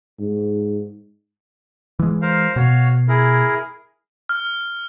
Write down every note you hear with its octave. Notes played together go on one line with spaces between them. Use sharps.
G#2
E3 G#3
A#4 C5 F5
B2 F#4 C#5 F5
E4 G#4 A#4
F6